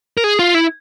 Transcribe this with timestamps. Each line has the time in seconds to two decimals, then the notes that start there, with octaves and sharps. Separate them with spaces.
0.17 A#4
0.24 G#4
0.39 F4
0.54 E4